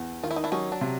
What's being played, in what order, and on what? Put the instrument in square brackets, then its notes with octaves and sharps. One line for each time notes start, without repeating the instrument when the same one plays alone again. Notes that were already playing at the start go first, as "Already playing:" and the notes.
Already playing: [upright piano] E2
[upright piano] D#3 [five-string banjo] F4
[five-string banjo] E4
D#4
D4 E4
[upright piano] F#3 [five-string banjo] C#4 D#4
[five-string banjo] D4
[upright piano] C3